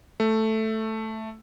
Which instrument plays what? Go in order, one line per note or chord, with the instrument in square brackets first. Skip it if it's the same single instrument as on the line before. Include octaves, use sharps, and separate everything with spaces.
[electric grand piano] A3